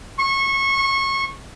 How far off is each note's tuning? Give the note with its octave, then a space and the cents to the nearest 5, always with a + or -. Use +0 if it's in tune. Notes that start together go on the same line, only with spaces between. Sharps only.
C#6 -25